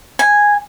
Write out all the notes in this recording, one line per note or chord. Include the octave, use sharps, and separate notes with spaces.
G#5